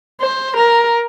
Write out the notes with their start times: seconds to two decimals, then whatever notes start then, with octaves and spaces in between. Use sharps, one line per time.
0.21 C5
0.57 A#4